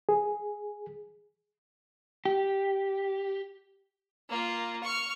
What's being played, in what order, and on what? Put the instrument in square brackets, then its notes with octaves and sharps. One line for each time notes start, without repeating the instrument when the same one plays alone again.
[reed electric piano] G#4
[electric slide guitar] G4
[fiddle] A#3 F4
C#6 F6